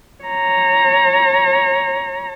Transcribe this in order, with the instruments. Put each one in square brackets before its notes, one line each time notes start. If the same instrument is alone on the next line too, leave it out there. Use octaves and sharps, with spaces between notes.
[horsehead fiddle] C#5 A#5